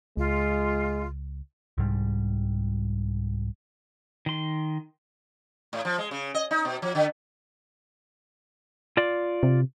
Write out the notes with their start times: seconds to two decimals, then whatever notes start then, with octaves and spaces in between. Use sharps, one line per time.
0.17 C#2 G#3 F4
1.78 C2 G#2 G3
4.26 D#3 C6
5.73 A2
5.85 F3
5.98 G#3
6.11 C#3
6.34 D#5
6.51 D#4
6.65 B2
6.82 F3
6.95 D3
8.97 F4 D5
9.43 C3